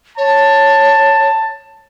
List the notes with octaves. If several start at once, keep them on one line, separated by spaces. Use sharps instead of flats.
C#5 A5